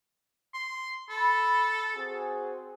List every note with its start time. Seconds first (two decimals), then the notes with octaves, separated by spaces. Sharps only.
0.54 C6
1.10 A4 B5
1.96 C4 F#4 G#4